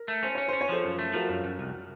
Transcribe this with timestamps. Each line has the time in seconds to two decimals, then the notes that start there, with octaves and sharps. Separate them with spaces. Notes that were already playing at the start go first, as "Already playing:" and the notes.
Already playing: A#4
0.08 A3
0.23 C#4 C5
0.35 C#4 C#5
0.48 C#4 C5
0.61 C#5
0.69 F3 A4 C5
0.84 F#2
0.99 A3
1.13 F3 F#4 A#4
1.29 F#2
1.44 F#2
1.59 C2